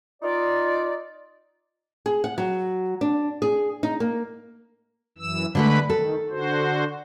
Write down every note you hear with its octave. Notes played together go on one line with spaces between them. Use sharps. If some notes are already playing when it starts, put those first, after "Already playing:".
D#4 F4 D5
G#4
F#5
F#3
D4
G#4
D#4
A#3
F#2 E3 E6
D3 G#3 A3 B4 B5
D#3 A4
D3 F#4 C5